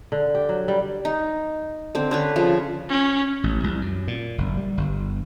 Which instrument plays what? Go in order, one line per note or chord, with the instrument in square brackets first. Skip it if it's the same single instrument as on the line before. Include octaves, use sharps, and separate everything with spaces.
[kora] D3
G4
F#3
G3
[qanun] D#4
D3 C4
D3 C#4 B4
C#3 F3
[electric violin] C#4
[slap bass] A1
C2
F#2
A#2
F#1
G3
G1